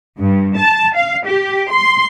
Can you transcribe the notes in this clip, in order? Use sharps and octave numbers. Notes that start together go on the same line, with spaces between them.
G2
A5
F5
G4
C6